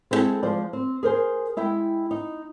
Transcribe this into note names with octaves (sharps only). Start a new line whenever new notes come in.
G#3 B3 C4 E4 G#4 A4
F3 G#3 C5 D5
C4
G#4 A#4 C5 G#5
G#3 E4 E5 G5
D#4